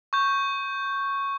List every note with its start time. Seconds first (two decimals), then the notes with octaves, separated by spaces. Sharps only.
0.13 C#6 G6